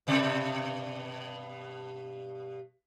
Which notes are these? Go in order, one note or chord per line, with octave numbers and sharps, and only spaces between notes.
G2 B2 D5